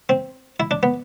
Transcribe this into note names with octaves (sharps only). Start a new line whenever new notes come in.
C4
E4
D4
B3